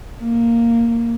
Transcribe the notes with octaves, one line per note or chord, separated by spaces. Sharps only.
A#3